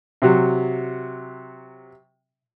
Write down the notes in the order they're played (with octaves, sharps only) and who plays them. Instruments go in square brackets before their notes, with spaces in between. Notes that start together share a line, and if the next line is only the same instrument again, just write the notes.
[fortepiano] C3 F#3